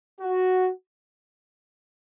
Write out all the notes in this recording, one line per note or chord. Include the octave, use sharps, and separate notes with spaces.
F#4